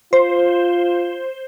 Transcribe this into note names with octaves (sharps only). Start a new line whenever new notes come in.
F4 C5